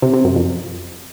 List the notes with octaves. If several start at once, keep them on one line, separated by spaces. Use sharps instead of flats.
C3
C3
F#2
F2